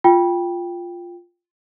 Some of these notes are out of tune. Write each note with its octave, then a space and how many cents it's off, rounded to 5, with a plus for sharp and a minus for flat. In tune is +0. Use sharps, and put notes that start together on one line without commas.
F4 +0 G5 +5